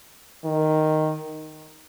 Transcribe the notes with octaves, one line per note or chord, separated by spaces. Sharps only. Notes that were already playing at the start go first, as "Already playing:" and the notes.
D#3